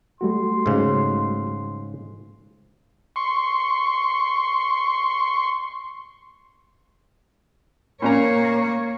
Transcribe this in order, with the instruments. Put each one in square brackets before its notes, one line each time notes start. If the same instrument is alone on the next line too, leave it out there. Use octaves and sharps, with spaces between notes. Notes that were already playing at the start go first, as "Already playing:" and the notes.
[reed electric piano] G3 A3 F#4 [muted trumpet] C6
[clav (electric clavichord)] G#2 C#3
[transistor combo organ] C6 C#6
[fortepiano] A#2 C#4 A#5 [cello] A#3 C#5